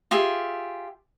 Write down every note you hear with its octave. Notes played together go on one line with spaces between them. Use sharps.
F4 G4 G#4 E5